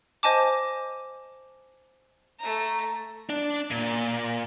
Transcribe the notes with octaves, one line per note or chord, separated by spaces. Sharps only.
C5 D#5 G#5 A5 D6
A3 A#5
D4
A#2